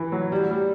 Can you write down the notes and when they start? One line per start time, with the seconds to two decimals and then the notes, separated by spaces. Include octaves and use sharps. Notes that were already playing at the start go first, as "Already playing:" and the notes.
Already playing: E3
0.12 F#3
0.32 G3
0.51 G3